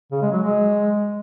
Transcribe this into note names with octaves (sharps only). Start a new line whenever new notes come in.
C#3
G#3
F#3
G#3